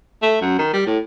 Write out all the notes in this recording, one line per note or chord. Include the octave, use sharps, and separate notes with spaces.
A3
F#2
D#3
G3
A2